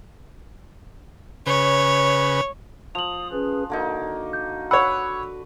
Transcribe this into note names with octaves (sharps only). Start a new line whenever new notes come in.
C#3 B4 C#5
F3 D#6 F7 F#7
C#4 G#4 B4
D3 A#3 D#4 F#4
G6
B4 C#5 F#5 B5 D6 E6